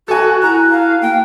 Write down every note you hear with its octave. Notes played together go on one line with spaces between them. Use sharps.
F#4 A4 G#5
E4 A#5 F#6
F5
A#3 G5